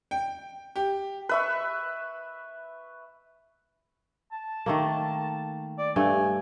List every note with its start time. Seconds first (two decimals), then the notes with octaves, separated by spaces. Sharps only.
0.11 G5
0.76 G4
1.29 B4 E5 C#6
4.32 A5
4.66 D#3 A3 A#3
5.78 D5
5.96 G2 A3 G#5